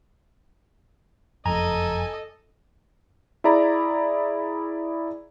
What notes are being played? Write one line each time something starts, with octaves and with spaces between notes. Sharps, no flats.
F#1 F2 A4 D#5 G#5 A#5
E4 G#4 D5 A#5 B5